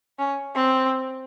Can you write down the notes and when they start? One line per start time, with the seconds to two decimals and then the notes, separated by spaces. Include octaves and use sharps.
0.19 C#4
0.55 C4